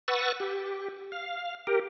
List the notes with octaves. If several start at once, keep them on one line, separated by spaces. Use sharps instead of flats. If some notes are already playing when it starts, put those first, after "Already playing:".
B4 F#5 C#6 E6 A6
G4
F5
G4 A#4